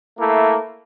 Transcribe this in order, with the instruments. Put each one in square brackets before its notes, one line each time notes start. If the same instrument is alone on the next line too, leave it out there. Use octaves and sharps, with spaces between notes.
[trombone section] A3 A#3 E4